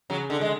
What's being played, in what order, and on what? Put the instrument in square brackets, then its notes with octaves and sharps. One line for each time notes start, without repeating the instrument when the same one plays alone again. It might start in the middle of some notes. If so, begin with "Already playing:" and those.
[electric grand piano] C#3 [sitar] F#3
[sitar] D3
[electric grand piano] D3 [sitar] G#3